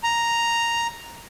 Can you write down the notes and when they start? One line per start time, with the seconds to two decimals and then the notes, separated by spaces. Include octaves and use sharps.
0.03 A#5